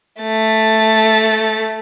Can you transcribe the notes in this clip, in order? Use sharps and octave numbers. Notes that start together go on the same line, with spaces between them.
A3 A6